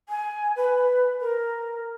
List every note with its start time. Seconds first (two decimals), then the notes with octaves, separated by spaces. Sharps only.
0.09 G#5
0.57 B4
1.21 A#4